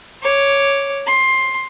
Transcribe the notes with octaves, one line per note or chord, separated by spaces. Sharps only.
C#5 D6
C6